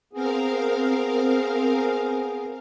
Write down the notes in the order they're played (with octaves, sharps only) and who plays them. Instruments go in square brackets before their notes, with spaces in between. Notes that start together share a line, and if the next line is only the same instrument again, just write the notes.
[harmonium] B3 G#4 [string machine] C4 A#4 F5